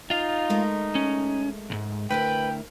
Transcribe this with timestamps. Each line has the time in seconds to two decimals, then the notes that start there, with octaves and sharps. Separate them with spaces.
0.10 D#4 F4 F5
0.49 G#3 A3 A#4
0.95 C#4
1.70 B1 G#2
2.11 D2 E4 A#4 B4 G5